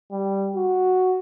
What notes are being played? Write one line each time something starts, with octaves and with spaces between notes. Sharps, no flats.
G3
F#4